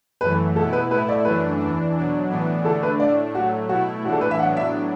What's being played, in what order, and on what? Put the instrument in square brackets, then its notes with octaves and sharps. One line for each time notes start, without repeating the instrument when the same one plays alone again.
[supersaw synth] F#2 E3 A3 [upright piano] B4
[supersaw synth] B2 B3 E4 [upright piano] A4
[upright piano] B4
[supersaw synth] A2 A3 E4 [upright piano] B4
[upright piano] D5
[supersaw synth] F#2 E3 A3 D4 [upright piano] B4
[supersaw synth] E2 E3 D4
B2 F#3 D4
A2 E3 B3 D4
[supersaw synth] D3 A3 D4 [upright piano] A4
[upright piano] B4
[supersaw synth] A2 A3 D4 [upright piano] D5
[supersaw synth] A2 F#3 A3 [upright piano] F#4
[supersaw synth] B2 A3 E4 [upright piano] F#4
[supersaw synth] A2 E3 D4 [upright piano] F#4
[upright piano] A4
B4
E5
[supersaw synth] A2 F#3 B3 D4 [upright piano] F#5
[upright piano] E5